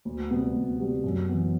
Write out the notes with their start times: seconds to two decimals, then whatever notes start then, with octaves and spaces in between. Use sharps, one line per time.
0.05 D2
0.31 C3 G3 B3
0.55 D2
0.79 C3 G3 B3
1.04 F#2
1.29 E3 B3